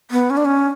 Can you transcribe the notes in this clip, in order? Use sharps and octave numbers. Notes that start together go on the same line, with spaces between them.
B3
C#4
D4
C#4